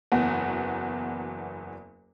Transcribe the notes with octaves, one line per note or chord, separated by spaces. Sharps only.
F#1 E2 B3 F#4